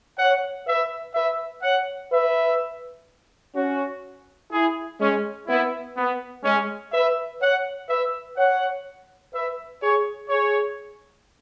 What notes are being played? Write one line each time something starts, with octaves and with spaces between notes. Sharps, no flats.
C#5 F#5
B4 E5
B4 E5
C#5 F#5
B4 E5
C#4 F#4
E4 G#4
G#3 C#4
B3 E4
B3
G#3 C#4
B4 E5
C#5 F#5
B4 E5
C#5 F#5
B4 E5
G#4 C#5
G#4 C#5